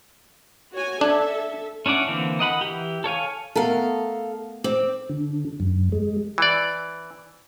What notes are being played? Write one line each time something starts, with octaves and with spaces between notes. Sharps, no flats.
F#4 C#5 G#5
D4 A4 E5
C#4 D4 E4 D5 F#5
D3 E3 A#3 C4
A#4 D#5 F#5 B5
E3 G4
A4 C#5 F5 G#5
A3 B3 A4 A#4 F5
C4 D6
D3
F#2
G#3
E3 D5